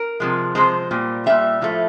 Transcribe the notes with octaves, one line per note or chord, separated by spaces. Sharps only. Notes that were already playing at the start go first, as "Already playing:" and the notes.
Already playing: A#4
C3 F3 G#3
C3 F3 G#3 C5
A#2 G3
A#2 G3 E5
A2 F3 A3